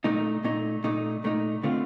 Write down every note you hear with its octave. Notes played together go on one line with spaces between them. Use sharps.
A#2 A3 D#4
A#2 A3 D#4
A#2 A3 D#4
A#2 A3 D#4
D3 A3 C4 F4